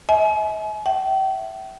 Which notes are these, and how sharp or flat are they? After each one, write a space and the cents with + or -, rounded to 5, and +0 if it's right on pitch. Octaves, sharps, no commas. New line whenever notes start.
E5 -45 G#5 +35
E5 +0 G5 -40